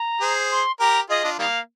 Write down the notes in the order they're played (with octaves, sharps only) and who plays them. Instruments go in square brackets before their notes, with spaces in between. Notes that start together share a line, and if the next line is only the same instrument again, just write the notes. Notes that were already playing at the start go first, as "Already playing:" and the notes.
Already playing: [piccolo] A#5
[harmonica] G#4 C5
[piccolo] C6
[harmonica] G4 A#4 [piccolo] A#5
[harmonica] F4 G#4 [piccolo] D#5
[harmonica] D4 F4
[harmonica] D#3 G3 A#3 [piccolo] F5